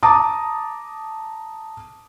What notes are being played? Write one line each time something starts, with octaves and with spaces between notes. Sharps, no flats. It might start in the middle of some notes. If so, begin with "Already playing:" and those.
A5 A#5 D6 D#6